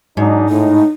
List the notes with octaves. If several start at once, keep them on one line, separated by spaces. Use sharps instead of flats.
G#2 F#3 D4 D#4
A2 D#4